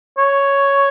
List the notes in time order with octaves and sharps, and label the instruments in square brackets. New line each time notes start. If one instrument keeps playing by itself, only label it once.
[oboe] C#5